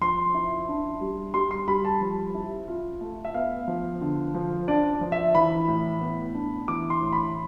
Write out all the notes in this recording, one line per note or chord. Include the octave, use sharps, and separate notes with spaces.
F3 C6
E4
D4
G3
G3 C6
C6
G3 B5
A5
F3
E4
F4
A3
E5
B3 F5
F3
D3
F3
D4 D5
F3
E5
E3 B5
A2
B3
D4
E3 D6
C6
A2
B5